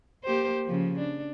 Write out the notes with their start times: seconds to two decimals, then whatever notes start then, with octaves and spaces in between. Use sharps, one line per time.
0.24 A#3 G4 C5
0.65 C#3 F3
0.99 D4